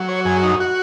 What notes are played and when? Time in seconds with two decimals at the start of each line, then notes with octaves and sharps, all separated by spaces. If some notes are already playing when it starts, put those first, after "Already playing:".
Already playing: F#3
0.09 C#5
0.25 F#2 G#4
0.43 D#4
0.60 F#4